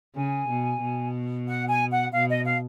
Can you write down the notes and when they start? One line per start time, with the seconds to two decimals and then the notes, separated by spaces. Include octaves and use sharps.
0.16 C#3 G#5
0.49 B2
0.82 B2
1.47 F#5
1.69 G#5
1.91 F#5
2.13 B2 F5
2.29 D#5
2.46 F5